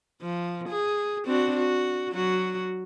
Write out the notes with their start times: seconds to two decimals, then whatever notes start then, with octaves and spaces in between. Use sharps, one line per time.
0.22 F3
0.69 G#4
1.26 C4 D4 F#4
1.57 F#4
2.11 F#3 F#4